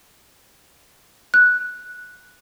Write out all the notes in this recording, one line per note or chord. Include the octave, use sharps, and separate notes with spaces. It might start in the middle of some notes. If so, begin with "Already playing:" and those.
F#6